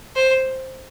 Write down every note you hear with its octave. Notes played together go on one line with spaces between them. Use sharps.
C5